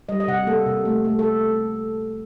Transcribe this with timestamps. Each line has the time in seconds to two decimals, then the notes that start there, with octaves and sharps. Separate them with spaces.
0.09 G3 D#5
0.20 D#5
0.28 C3 F#5
0.47 A#3 A4
0.66 C3
0.85 A3
1.05 A3
1.19 A4